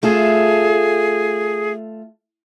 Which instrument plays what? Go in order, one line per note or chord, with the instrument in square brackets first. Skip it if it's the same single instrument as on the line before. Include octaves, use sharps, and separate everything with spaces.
[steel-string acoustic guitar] A3 F4 A4 [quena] G#4